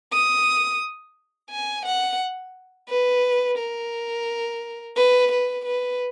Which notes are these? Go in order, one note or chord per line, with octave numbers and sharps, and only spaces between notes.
D#6
G#5
F#5
B4
A#4
B4
B4
B4